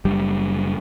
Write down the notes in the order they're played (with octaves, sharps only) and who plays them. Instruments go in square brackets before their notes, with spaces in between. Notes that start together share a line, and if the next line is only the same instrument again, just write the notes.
[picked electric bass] F#1 G3